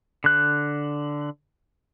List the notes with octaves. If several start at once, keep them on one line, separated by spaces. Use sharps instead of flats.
D3 F#6